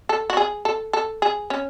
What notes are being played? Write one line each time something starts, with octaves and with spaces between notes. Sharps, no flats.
A4
F#4
G#4
A4
A4
G#4
C#4